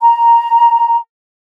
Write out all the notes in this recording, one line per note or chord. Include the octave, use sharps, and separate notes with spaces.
A#5